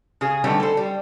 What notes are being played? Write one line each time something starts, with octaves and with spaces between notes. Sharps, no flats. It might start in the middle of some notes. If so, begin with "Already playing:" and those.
C#3 G#4
D3 G3 A3 C#4 D#4 B4
A4 C5
G3